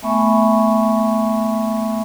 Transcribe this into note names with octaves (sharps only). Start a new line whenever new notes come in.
A3 B3 E5 G#5 B5 C#6